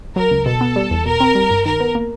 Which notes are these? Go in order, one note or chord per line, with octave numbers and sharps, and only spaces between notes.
F#3 A#4
C#2
B2 A4
B3
G3
E2
B2 A#4
C4
G3
G2
D#3 A#4
B3
A#3